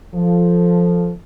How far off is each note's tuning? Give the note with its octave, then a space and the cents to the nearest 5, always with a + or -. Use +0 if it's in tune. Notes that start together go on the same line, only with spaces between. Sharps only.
F3 +0 A4 +0